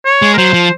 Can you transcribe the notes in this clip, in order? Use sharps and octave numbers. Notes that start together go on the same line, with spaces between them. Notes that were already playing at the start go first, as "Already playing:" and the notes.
C#5
G#3
A#4
F#3 C5
F3